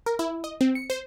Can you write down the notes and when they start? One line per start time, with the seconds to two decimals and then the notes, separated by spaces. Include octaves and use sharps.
0.06 A#4
0.19 E4
0.44 D#5
0.61 C4
0.75 C#7
0.90 C5